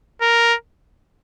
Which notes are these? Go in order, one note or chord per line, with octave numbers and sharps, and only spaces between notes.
A#4